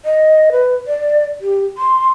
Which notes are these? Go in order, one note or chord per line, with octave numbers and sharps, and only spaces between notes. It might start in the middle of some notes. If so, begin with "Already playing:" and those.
D#5
B4
D5
G4
C6